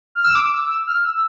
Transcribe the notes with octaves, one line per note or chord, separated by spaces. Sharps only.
F6
E6
D6
E6
E6
F6
E6